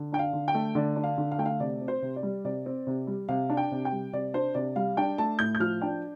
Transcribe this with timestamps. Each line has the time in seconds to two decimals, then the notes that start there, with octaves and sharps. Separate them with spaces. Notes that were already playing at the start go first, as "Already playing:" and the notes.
Already playing: D3
0.12 D4 G5
0.19 F5
0.33 D3
0.48 G5
0.55 A3
0.75 D3 D5
0.96 D4
1.04 F5
1.18 D3
1.32 F5
1.39 A3 G5
1.46 F5
1.60 C3 D5
1.81 C4
1.88 C5
2.02 C3
2.16 D5
2.23 G3
2.45 C3 D5
2.66 C4
2.87 C3
3.07 G3
3.29 C3 F5
3.50 D4
3.57 G5
3.71 C3
3.85 G5
3.92 G3
4.13 C3 D5
4.34 D4 C5
4.55 C3 D5
4.76 G3 F5
4.97 D4 G5
5.18 A3 A5
5.39 A2 G6
5.55 G6
5.60 F3 F6
5.82 D4 G5